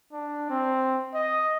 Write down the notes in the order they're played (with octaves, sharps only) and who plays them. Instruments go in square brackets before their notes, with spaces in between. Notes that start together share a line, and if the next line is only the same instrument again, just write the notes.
[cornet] D4
C4
D#5